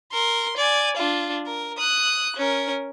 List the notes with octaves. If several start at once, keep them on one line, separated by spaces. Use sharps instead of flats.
A#4 C6
D5 G#5
D4 F4
A#4
D#6 F#6
C#4 A#4